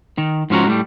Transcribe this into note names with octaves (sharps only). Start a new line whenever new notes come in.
D#3
G#2 F3 C#4 F#4 A#5
A2 G3